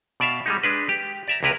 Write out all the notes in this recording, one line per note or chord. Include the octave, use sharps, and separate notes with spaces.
B2 D5 E5 F5
G3 G#3 D#4
G#3 D4 B4
G4
D5 E5 A#5
C#2 C3 E4 A#4 B4 A#5